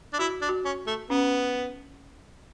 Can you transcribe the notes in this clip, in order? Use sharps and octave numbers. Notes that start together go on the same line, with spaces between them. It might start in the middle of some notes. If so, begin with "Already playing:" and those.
D4
E4 F#4
D4
F#4
C#4
A3
B3 C#4